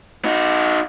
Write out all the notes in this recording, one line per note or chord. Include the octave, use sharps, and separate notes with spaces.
D#4 F#4